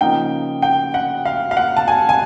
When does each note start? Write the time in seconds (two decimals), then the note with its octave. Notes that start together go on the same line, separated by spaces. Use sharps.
0.01 C#3 F3 A#3 D#4 G5
0.62 G5
0.94 F#5
1.25 F5
1.51 F5
1.57 F#5
1.77 A5
1.88 G#5
2.09 G#5